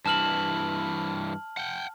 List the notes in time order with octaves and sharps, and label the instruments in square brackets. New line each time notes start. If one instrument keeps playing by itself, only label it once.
[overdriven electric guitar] G2 E3 [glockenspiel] A5 F6 F#7
[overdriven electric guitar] F#5 G5